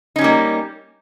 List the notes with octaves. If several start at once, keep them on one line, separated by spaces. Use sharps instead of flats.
G3 A#3 C#4 D#4